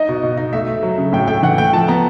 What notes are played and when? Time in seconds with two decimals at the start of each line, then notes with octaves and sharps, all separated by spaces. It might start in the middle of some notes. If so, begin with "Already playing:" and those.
Already playing: D#4 D#5
0.09 B2
0.23 B2
0.37 D#4
0.53 A3 E5
0.68 A3
0.83 F#3
0.98 C#3
1.13 A2 G5
1.28 A3 G5
1.43 E3 F#5
1.58 A3 G5
1.73 F3 A5
1.88 B3 A#5